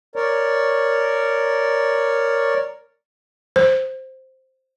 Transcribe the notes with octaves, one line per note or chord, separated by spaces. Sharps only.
A#4 C#5 D5
C5